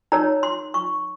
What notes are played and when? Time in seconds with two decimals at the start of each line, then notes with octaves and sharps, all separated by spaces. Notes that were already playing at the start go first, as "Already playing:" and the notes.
0.12 D#4 A#4 C#5 A#5
0.43 C6
0.74 C#6